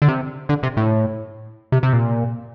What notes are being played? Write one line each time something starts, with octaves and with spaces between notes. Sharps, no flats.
D3
C3
D3
C3
A2
C3
C3
A#2